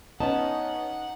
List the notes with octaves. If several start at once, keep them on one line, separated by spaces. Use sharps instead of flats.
B3 C#4 D#4 F#5 A5